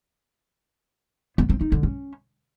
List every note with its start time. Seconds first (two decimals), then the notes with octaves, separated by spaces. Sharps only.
1.38 B3
1.49 C4
1.61 D#4
1.72 D3
1.83 C#4